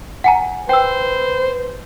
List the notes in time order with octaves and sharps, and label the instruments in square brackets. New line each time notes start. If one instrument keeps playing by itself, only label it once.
[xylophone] F#5 G#5 A#5
[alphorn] B4 [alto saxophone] C5 [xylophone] G5 E6